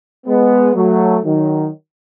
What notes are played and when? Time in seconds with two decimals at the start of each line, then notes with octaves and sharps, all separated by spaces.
0.26 G#3 B3
0.75 F#3 A3
1.25 D#3 F#3